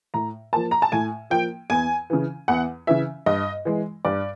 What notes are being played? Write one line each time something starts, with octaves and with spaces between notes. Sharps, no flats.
A2 A#5
F3 A#3 A5
A#5
A5
A2 G#5
F3 A#3 G5
E2 G#5
C#3 E3
E2 F#5
C#3 E3 E5
G2 D#5
E3 G#3
G2 D5